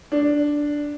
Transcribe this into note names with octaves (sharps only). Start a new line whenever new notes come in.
D4